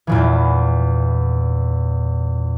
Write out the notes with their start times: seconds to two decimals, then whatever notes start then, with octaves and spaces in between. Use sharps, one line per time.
0.07 E2 A#2 E3